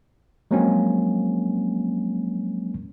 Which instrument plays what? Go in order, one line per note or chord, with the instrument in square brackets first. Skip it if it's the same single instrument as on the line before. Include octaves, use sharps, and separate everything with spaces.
[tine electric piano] F3 F#3 G#3 A#3 C4 C#4